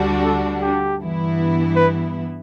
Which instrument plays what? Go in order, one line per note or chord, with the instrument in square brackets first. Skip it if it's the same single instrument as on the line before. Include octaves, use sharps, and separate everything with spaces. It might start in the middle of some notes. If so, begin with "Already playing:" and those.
Already playing: [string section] D2 D3 G3 D4 F#4
[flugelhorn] A4
G4
[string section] G2 E3 B3 E4
[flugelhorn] B4